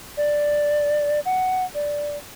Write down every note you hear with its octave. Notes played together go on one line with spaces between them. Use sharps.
D5
F#5
D5